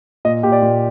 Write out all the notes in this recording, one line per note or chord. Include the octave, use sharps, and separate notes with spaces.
A#2 D#5
A#2 G4
D5
A#2